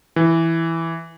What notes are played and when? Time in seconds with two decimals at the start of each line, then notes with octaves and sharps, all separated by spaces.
0.16 E3